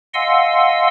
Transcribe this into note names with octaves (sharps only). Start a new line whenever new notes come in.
D#5 F5 F#5 G#5 C6 E6